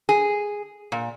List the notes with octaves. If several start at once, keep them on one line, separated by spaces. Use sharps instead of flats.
G#4
A#2